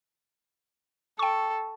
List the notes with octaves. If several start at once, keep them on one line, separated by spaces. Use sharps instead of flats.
A4 G5 C#6